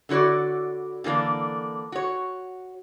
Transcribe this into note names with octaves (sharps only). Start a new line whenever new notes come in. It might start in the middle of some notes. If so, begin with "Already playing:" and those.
D3 E4 F#4 C#5 D5
D3 E3 A#3 D4
F#4 C#5